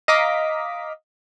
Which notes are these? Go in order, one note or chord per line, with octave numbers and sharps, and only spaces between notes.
D#5 F5 A#5 D6 B6